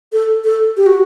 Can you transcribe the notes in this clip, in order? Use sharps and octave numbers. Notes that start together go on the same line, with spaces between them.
A4
A4
G4
F#4